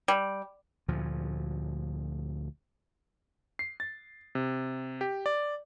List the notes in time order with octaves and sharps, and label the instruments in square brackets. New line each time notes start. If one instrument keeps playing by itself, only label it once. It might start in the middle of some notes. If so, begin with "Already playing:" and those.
[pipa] G3
[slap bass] D2 A#2 F3
[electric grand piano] C7
A6
C3
G4
D5